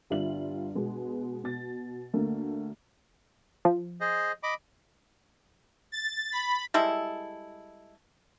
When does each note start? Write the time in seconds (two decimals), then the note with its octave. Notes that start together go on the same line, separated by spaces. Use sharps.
0.10 G1 G3 F4 E5 F#7
0.75 B2 G#3 B3
1.44 B2 A6
2.14 D2 A3 A#3
3.65 F3
4.01 G#4 C5 D#5
4.43 D#5 B5 D6
5.92 A6
6.32 B5
6.74 G3 G#3 E4 A4